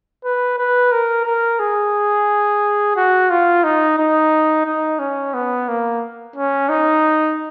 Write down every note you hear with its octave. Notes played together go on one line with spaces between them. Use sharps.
B4
B4
A#4
A#4
G#4
F#4
F4
D#4
D#4
D#4
C#4
B3
A#3
C#4
D#4